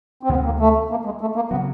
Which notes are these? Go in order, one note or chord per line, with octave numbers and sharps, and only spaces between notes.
C4
D2 C3 D#3 G#3 B3
A#3
A3
A#3
G#3
A3
A#3
C#3 F#3 B3